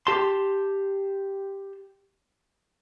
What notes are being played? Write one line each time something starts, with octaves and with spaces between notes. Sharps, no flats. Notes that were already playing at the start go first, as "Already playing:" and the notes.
G4 A5 C6